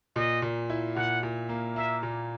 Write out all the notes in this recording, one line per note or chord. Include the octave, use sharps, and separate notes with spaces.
A#2 D#5
A#2
E4
A#2 F#5
A#2
A#3
A#3 E5
A#2